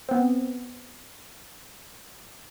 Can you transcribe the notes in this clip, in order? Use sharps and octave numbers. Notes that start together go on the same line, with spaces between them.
B3 C4